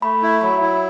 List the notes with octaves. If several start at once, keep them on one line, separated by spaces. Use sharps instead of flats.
A3 B5
E4
F#3 B5
E4